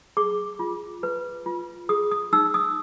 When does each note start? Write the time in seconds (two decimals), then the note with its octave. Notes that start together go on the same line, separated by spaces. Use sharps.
0.17 G#4 D6
0.59 F4
1.03 B4
1.46 F4
1.89 G#4 D#6
2.11 D#6
2.33 D#4 E6
2.54 D#6